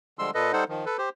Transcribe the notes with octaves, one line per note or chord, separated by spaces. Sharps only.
D3 F3 G3 G#3 C6 E6
A#2 A4 B4 D#5
G3 D#4 A4 C5 F#5
D#3 F3
A4 B4
G4 C5